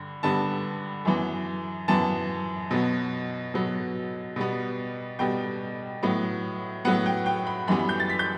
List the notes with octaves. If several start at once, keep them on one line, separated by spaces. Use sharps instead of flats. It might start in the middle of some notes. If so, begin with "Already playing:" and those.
Already playing: G2 D3
G2 D3 G3 B3 A5
F#2 E3 B3
F#2 E3 B3 A5
B2 F#3 B3
B2 F#3 B3
B2 G3 B3
B2 G3 B3 G5
A2 F#3 B3
A2 F#3 B3 F#5
G5
G5
B5
F#2 E3 G3 B3 B5
G6
A6
B6
G6